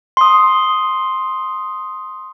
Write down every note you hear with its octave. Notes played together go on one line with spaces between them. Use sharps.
C6 D#6